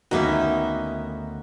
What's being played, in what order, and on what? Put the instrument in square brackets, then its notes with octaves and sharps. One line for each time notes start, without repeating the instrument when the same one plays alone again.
[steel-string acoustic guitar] D2 E5 [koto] D#3 A#3 C#4 [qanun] B3 D#4 [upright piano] F#4